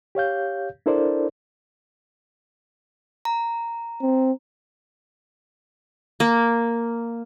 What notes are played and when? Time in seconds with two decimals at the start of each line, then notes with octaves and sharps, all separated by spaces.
0.15 G4 C#5 F5 G6
0.86 D4 E4 A4 A#4 C5 D5
3.25 A#5
4.01 C4
6.20 A#3